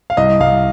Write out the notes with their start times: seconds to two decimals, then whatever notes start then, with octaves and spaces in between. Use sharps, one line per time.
0.10 F5
0.17 C2 D#5
0.40 C2 F5